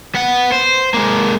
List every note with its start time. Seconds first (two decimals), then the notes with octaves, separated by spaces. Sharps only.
0.15 B3 F#5
0.52 C5
0.94 G#3 A#3